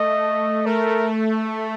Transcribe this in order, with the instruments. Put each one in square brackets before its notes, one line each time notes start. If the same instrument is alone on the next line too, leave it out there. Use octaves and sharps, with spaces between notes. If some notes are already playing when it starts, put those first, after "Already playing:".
Already playing: [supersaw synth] A3 [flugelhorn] D#5
[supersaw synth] A3 [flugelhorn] A#4